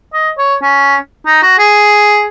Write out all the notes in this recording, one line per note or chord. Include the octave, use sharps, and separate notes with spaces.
D#5
C#5
C#4
D#4
F#4
G#4